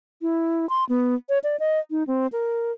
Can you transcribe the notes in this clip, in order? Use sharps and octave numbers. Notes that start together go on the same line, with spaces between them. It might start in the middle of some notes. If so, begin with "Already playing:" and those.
E4
C6
B3
C#5
D5
D#5
D#4
C4
A#4